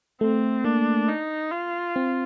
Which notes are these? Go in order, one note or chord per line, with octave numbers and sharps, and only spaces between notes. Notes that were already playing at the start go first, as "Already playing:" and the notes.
A3 C4
A#3 D4
D#4
F4
C4